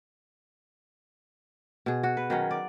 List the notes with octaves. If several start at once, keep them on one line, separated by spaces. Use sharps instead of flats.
B2 G#4
F#4
B4
D#3 F#3 C#4
D5